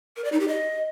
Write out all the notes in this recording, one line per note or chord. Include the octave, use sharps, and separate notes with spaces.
A#4
D5
D#4
G4
D#5